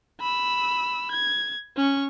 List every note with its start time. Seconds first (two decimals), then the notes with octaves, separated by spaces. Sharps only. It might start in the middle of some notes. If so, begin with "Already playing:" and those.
0.21 B5 E6
1.11 G#6
1.77 C#4 C#6